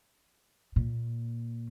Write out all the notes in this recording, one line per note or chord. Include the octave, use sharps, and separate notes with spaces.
A#2